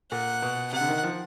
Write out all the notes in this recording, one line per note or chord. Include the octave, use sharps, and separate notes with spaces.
A#2 F#5
B2
C3 F#5
D3
D#3
F3